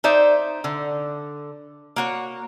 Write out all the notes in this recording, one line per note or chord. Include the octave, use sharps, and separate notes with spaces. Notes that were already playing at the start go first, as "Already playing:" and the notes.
D#4 C5 D5 E5
D3
A#3 F#4 C#5